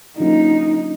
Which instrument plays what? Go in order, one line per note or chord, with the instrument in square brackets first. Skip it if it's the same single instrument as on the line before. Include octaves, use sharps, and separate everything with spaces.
[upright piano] D3 F#3 A#3 C#4 F4 [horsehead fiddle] D#4